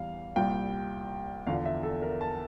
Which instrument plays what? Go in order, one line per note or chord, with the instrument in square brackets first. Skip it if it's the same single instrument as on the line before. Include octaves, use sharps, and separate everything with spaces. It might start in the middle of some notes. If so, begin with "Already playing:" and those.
Already playing: [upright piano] E2 E3 G3 F5
C2 A#2 G3 G5
E2 D3 F3 F5
E5
A4
A#4
A5